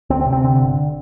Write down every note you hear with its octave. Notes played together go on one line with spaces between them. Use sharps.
D2 C4
C4
C3
C4
D3 C4
G1